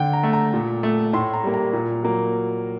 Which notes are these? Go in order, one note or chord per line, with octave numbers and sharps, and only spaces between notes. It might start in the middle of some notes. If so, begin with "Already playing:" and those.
Already playing: D3 G5
A#5
A3
A#5
A#2
A3
A2 C6
A#5
G3 A#3
A#5
A#2
F#3 A#3